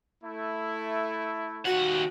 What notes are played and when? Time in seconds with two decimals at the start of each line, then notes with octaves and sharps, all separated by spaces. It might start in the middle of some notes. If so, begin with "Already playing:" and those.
0.24 A3 E4
1.66 D#2 F#4 F#5